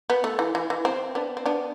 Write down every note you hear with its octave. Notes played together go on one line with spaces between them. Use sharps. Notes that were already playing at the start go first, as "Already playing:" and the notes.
B3
A3
E3
E3
E3
C4
B3 D4
C4
B3 D4